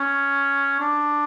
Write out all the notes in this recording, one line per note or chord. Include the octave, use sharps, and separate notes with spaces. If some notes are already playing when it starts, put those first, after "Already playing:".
Already playing: C#4
D4